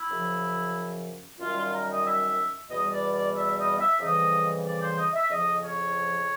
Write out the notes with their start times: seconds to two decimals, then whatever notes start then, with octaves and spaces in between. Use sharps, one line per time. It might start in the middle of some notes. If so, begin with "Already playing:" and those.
Already playing: E4
0.11 F#2 C#3 F3
1.40 F#2 D#3 G3 F4
1.56 F4
1.72 A#4
1.89 D#5
2.05 E5
2.70 E2 B2 G3 D#5
2.91 D5
3.14 D5
3.36 E5
3.57 D#5
3.79 E5
4.00 F2 C#3 E3 G3 D#5
4.65 D5
4.81 C5
4.97 D#5
5.14 E5
5.30 F2 C#3 F3 D#5
5.63 C#5